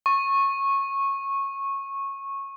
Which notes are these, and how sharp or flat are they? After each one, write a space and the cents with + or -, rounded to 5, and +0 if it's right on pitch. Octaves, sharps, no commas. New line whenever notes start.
C#6 -15